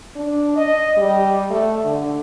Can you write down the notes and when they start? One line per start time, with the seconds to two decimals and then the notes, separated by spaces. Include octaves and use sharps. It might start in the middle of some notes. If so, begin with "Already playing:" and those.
0.16 D4
0.56 D#5
0.97 G3
1.50 A3
1.84 D3